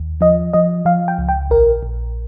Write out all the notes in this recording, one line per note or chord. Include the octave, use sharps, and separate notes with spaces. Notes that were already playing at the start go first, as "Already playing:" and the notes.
Already playing: D#2
F3 D#5
F3 D#5
F3 F5
G5
C#2
G5
A#1 A#4
A#1